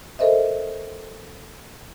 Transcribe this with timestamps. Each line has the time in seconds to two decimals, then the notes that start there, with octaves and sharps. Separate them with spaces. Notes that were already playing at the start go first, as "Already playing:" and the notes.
0.19 A4 A#4 C5 D#5 E5